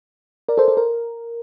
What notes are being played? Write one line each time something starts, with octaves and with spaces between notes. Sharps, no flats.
A#4 D5
A4 C5
A4
A#4